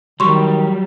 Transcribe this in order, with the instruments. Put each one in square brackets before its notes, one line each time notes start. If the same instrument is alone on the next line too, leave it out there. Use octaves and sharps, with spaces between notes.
[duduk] D#3 [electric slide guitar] F#3 G3 [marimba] C6 C#6